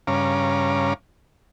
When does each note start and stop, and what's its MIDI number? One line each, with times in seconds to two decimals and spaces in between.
0.07 0.94 43
0.07 0.94 49
0.07 0.94 61
0.07 0.94 77
0.07 0.94 82
0.07 0.94 86